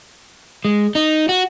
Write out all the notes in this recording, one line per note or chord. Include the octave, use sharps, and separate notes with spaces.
G#3
D#4
F#4